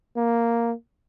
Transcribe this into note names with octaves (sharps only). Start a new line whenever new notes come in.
A#3